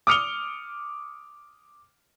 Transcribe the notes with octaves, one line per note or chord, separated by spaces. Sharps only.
D6 D#6 F6 C#7 F7 G7